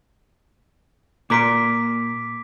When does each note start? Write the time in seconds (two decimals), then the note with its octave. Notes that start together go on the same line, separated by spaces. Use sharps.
1.30 A#2 A#4 C6 D6 B6 D7